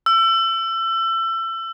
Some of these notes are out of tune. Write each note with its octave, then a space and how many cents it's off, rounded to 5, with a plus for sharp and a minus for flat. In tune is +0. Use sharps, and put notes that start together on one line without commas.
E6 +30